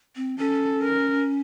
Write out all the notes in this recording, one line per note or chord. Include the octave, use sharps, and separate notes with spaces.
C4
C#4 A4
A#4